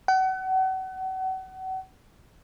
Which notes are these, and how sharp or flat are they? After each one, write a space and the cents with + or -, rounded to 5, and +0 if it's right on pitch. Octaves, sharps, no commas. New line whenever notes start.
F#5 +35